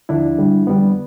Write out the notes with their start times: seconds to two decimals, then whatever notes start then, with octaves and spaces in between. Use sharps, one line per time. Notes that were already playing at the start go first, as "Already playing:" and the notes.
0.09 D#2 D3 F3 D4 E4
0.39 F2 D3 G3
0.67 F2 D3 G3 B3